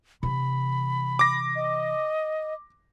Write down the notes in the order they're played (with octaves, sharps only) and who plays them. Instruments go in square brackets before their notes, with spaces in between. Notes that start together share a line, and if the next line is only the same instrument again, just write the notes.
[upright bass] C3 E3 [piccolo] B5
[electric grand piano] D6 A#6
[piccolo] D#5